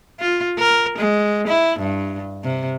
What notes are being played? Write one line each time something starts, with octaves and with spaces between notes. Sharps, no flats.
F4
A#4
G#3
E4
G2
C3